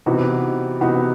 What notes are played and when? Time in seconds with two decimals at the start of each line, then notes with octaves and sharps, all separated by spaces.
0.06 C3 E3 B3 D#4 F#4
0.81 C3 E3 B3 D#4 F#4